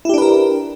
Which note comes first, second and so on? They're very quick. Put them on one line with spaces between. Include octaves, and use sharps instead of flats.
E4 G4 D4 B4 A#4